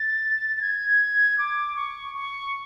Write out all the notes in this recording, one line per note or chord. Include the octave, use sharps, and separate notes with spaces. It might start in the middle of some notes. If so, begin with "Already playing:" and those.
Already playing: A6
A6
G#6
D6
C#6
C#6